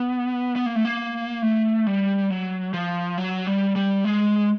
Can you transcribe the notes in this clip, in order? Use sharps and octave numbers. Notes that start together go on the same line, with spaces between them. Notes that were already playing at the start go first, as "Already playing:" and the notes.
Already playing: B3
B3
A#3
A3
A#3
A3
G3
F#3
F3
F#3
G3
G3
G#3